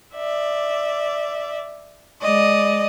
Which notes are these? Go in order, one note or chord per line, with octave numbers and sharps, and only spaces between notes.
D5 E5
G#3 D5 D#5